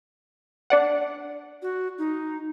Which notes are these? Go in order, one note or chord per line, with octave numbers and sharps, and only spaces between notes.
D4 D5 F#5
F#4
D#4